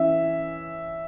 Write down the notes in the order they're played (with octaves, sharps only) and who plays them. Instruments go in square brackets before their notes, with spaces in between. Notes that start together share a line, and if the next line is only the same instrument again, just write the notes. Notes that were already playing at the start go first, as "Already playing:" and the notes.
Already playing: [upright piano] E3 C#4 [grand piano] E5